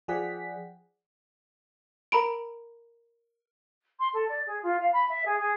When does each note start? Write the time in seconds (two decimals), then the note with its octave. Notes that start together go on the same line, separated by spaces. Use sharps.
0.08 F3 G#4 D5 F#5 G5 B6
2.12 A#4 A#5 B5 D7
3.99 C6
4.13 A4
4.28 D5
4.46 G#4
4.62 F4
4.79 F5
4.92 B5
5.08 E5
5.25 G#4
5.39 G#4